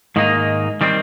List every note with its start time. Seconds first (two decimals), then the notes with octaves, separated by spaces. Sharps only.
0.16 G#2 D#3 A#3 D#4
0.81 D#3 G3 C4